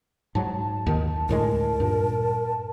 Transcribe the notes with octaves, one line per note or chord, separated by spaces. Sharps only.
G#2 F#3 A5
D#2 D#3
D2 A2 G#3 A#4
G2 A#2